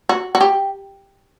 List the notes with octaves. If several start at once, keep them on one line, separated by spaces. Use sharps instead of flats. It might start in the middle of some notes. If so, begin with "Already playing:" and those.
F#4
F#4
G4